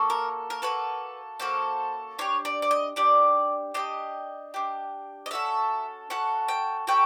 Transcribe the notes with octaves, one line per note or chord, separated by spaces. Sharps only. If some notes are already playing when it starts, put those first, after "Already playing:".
Already playing: A#3 C#4 F#4 A4
A#4
A#4
A#3 C#4 F#4 A4 B4
A#3 C#4 F#4 A4 C5
D4 G4 C#5
D5
D5
D#5
D4 G4 D5
D4 G4 D#5
D4 G4
D#5
C#4 F#4 A4 E5
C#4 F#4 A4 F#5
G5
C#4 F#4 A4 G5